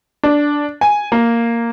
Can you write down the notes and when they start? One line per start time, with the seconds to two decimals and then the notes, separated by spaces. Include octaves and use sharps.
0.23 D4
0.81 G#5
1.12 A#3